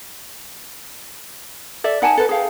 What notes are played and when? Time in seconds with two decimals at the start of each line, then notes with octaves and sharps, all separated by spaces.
1.84 A4 D5 E5
2.02 D#4 F#5 G#5 A5
2.17 A4 B4
2.29 G#4 F5 G5